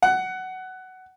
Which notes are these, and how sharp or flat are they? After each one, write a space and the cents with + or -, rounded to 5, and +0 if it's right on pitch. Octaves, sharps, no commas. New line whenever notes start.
F#5 +15